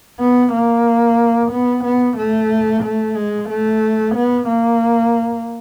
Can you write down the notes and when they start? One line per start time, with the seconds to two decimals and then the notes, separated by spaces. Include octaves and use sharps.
0.20 B3
0.53 A#3
1.51 B3
1.84 B3
2.17 A3
2.83 A3
3.16 G#3
3.49 A3
4.15 B3
4.48 A#3